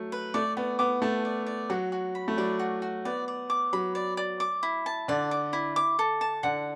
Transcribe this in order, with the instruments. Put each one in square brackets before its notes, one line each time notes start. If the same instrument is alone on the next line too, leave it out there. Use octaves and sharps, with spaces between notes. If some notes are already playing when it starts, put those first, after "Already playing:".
Already playing: [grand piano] F#3 A3
[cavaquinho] B4
[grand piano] A3 [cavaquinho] D5
[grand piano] B3 [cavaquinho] D5
[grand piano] B3 [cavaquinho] D6
[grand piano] A3 [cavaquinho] A5
[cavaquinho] D5
D5
[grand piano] F#3 [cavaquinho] F#4
[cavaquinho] F#4
B5
[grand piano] A3
[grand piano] F#3 [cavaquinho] D5
[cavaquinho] F#4
F#4
[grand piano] B3 [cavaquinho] D5
[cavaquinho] D5
D6
[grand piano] F#3 [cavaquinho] B5
[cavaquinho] D5
D5
D6
E4
A5
[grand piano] D3 [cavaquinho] D5
[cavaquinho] D6
E4
D6
A4
A5
[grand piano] D3 [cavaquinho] F#5